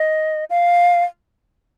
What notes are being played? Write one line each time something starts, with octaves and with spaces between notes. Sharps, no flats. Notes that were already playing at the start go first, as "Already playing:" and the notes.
Already playing: D#5
F5